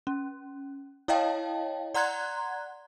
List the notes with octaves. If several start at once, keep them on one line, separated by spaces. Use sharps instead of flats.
C#4
E4 C#5 D#5 F5 G5 A5
D5 F#5 A#5 C6 F#6 G#6